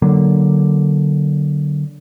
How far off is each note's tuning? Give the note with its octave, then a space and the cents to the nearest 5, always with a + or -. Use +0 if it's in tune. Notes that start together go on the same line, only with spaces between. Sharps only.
D3 +0 F#3 +20 A#3 +0